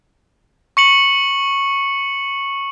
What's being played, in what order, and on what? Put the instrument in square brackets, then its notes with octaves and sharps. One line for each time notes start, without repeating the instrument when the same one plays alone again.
[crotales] C#6 C#7 F#7